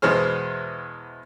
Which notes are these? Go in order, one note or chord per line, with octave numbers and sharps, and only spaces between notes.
E2 B2 G#3 C5 F6